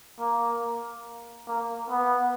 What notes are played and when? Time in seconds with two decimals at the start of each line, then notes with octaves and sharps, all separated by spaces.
0.20 A#3
1.48 A#3
1.90 B3